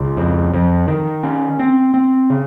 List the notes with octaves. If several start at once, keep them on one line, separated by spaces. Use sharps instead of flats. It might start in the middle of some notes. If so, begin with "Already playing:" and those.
Already playing: C#2
F2
F2
D#3
C#4
C4
C4
C#3